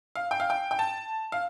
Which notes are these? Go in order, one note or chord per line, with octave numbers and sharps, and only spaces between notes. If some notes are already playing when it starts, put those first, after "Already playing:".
F5
G5
F5
G5
G5
A5
F5